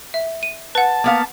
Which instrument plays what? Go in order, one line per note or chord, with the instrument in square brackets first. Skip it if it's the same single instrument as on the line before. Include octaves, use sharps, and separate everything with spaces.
[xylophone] E5
D#7
[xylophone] B4 F#5 [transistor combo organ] A5
[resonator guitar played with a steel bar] A#3 B3 F5